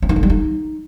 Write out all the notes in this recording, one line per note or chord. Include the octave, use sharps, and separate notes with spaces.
C4
D#4
D3
G3
D#4